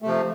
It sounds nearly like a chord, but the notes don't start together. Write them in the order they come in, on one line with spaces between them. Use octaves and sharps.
A3 C3 F3